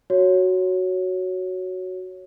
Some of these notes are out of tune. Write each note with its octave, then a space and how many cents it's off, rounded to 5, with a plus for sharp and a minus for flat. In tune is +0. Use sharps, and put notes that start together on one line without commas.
F#4 +0 C#5 +0